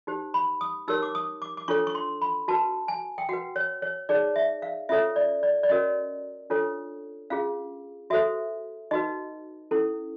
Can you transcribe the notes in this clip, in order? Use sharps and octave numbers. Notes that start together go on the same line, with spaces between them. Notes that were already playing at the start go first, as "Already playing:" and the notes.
D#4 G4 C5
B5
D#6
D#4 G4 A#4 C#5 E6
D6
D#6
D6
D6
D4 F4 A4 C#5 C#6
C#6
C6
B5
F#4 B4 A5
G#5
G5
F#4 B4 F#5
C#5
C#5
D#4 G#4 C#5 D5
E5
F5
C#4 F4 A4 C#5 E5
D5
D5
D5
C#4 F#4 A#4 C#5 D#5
D4 F4 A4 C#5
C#4 F4 G#4 F5
F#4 A4 C5 E5
D#4 F#4 B4 D#5
C#4 E4 A4